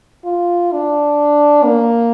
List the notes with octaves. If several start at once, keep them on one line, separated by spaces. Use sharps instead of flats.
F4
D4
A#3